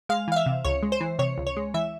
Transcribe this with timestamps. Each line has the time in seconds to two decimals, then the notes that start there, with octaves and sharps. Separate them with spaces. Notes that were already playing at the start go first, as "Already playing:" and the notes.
0.09 G#3 F5
0.28 E3 F5
0.36 E5
0.46 C3
0.65 C#2 C#5
0.83 G#3
0.92 C5
1.01 E3
1.19 C3 C#5
1.38 C#2
1.47 C#5
1.57 G#3
1.74 E3 E5